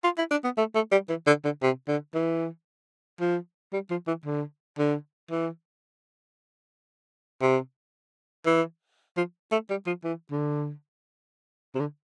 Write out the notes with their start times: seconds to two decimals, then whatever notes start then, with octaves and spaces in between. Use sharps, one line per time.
0.04 F4
0.18 E4
0.31 D4
0.44 B3
0.58 A3
0.75 A3
0.92 G3
1.09 E3
1.27 D3
1.45 D3
1.62 C3
1.88 D3
2.15 E3
3.20 F3
3.73 G3
3.91 F3
4.08 E3
4.26 D3
4.79 D3
5.31 E3
7.41 C3
8.46 E3
9.17 F3
9.52 A3
9.70 G3
9.87 F3
10.04 E3
10.32 D3
11.75 C3
11.80 D3